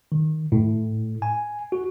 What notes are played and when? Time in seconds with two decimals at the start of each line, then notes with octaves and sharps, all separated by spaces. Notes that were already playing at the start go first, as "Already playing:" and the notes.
0.12 D#3
0.52 A2
1.22 G#5
1.72 F#4